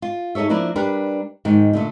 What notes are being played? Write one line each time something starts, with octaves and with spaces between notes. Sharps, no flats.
F4
D#4 G#4 A4 C#5 E5
F3 A#3 D4 E4 A#4 D5
G3 D4 A#4 B4
G#2 D#3
A#2 D3 A3